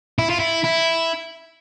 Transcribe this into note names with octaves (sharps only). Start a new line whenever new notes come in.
E4
F4
E4
E4